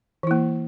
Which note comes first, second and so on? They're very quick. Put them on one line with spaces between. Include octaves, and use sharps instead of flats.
E3 E4 A#3